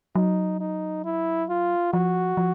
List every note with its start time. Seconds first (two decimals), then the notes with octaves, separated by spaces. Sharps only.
0.15 F#3 D#4
0.60 D#4
1.04 E4
1.49 F4
1.93 F3 F#4
2.37 F3